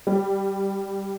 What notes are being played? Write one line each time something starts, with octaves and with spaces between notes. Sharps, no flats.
G3